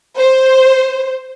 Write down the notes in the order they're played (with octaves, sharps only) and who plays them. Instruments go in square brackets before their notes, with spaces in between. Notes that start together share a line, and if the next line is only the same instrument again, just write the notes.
[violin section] C5